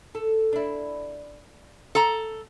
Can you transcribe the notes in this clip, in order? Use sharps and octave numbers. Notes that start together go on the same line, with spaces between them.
A4
D4 E4
A4 A#5